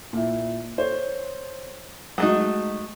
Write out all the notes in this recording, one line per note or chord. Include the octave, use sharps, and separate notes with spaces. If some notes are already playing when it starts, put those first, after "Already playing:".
A#2 E4
C5 C#5
F#3 G#3 A3 D#4 F#4